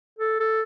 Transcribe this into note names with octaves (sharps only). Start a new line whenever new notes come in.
A4
A4